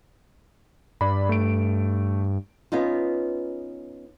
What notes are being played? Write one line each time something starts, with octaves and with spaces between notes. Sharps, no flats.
G2 D5 B5
A3 D7
B3 C#4 D#4 F4